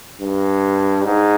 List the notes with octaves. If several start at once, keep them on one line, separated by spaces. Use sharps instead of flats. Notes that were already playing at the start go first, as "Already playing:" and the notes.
G2
G#2